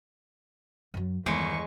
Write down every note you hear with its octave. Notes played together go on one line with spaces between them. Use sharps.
F#2 F#3
G1 E2 D#3 G#3 C#6 C#7